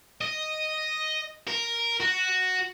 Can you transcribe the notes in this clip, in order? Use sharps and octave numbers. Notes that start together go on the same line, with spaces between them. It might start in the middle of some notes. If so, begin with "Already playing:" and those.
D#5
A#4
F#4